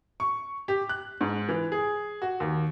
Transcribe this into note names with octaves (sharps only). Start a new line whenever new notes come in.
C#6
G4
F#6
G#2
E3
G#4
F#4
D#2